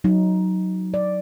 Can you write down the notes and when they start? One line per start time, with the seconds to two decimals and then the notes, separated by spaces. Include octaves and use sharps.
0.04 F#3 D#4
0.94 D5